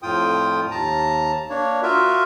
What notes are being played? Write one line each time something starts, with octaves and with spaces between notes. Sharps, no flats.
F2 A2 F4 G5 D#6
D#2 A5 A#5
A#3 D4 C#5
F4 F#4 A#4 E5